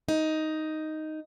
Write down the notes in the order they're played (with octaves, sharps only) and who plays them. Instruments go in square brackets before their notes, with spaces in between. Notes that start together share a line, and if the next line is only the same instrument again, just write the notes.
[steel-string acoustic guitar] D#4